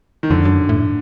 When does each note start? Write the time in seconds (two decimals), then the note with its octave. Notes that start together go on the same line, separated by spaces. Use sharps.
0.23 D#3
0.30 F2 D3
0.45 F#2
0.69 A2